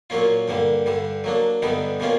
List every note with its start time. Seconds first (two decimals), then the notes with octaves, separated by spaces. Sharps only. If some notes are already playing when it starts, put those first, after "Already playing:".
0.10 A#2 F#3 A#3 C#4 F4
0.48 G2 D3 G3 A#3
0.86 G2 D3 G3
1.24 F#3 A#3 D4
1.62 G2 D3 G3 B3 D#4
2.00 B2 G3 A#3 C#4 F4